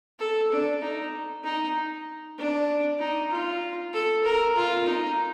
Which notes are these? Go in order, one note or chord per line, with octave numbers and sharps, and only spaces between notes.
A4
D4
D#4
D#4
D4
D#4
F4
A4
A#4
F4
D#4